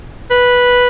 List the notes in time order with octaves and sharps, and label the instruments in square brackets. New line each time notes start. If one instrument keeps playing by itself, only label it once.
[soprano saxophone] B4